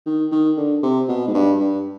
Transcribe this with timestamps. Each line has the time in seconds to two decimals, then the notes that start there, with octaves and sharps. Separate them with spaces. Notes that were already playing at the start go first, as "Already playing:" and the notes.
0.06 D#3
0.32 D#3
0.57 D3
0.83 C3
1.08 B2
1.27 G#2
1.34 G2
1.60 G2